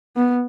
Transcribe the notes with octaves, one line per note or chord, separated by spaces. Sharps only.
B3